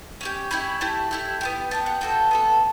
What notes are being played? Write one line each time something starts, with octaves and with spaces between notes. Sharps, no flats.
C#4 E4 G4
C#4 E4 G4 B5
A3 E4 G4
A3 E4 G4
B3 E4 G4
B3 E4 G4 A5
F#5
B3 F#4 A4 G5
B3 F#4 A4